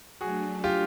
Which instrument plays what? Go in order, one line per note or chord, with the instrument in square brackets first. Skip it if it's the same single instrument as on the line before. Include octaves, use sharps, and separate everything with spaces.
[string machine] F#3 A3 D4 [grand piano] F#4 G#4
[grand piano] F4 G4